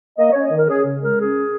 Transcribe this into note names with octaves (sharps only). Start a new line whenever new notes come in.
A#3 D#5
C#5
C#4
D#5
D#3 A#4
C#4 G#4
C#3
G#3 A#4
C#4 G#4